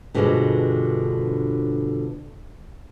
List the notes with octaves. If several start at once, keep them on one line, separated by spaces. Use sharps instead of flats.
G2 B2 D3 F3 G3 G#3